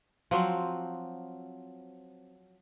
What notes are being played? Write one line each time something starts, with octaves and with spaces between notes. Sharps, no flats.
F3 F#3 C4